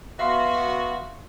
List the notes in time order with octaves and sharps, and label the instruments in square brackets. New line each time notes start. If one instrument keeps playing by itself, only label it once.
[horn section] B3 F#4 [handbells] E5 F5 C6